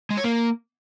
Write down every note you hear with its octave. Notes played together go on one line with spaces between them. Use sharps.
G#3
C#5
A#3